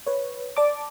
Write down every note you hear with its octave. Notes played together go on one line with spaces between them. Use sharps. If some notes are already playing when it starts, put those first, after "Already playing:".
B4 C#5
D5 A5 D6